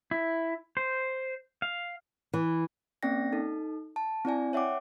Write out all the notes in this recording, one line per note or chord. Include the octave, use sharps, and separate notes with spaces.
E4
C5
F5
E3
A#3 C4 C#4 D5 G5 A#6
D#4 A4
A5
C4 E4 D5 G#5
C#5 E5 F#5 G5 D6